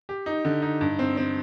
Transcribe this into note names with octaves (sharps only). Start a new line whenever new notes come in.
G4
D#4
D3
D#4
G2
C4
C4